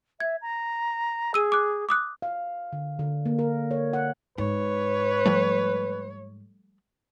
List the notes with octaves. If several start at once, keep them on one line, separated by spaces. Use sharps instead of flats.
E5 G#6
A#5
G#4 E6 D#7
D6 F#6
D6 D#6 F#6
F5
D3
D3
A#3
A#4
C#5
F#5
G#2 B4 C#5
F3 G3 A3